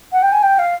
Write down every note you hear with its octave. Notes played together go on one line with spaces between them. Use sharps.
F#5
G5
G#5
G5
F5